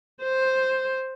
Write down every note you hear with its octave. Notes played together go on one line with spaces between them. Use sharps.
C5